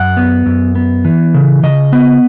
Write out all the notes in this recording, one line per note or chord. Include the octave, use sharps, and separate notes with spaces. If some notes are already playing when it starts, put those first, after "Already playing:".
Already playing: F#2 F#5
B3
F#2
B3
E3
C#3
C#3 D#5
B3